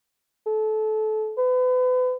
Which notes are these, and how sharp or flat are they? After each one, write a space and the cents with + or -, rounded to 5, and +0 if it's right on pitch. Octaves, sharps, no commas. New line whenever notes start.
A4 -25
B4 +35